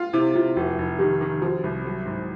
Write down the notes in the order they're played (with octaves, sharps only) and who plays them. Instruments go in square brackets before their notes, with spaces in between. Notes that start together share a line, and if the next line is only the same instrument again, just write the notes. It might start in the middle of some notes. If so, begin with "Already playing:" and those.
Already playing: [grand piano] F4
[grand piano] C3 [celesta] E4
[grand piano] C3 [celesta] F4
[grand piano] F1 [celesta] F#4
[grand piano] F1
[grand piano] D#3 [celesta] G4
[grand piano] D#3
[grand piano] F3 [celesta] F#4
[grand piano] C2
F#3
G#2